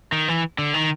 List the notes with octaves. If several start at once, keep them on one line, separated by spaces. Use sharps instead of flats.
D#3
E3
D3
D#3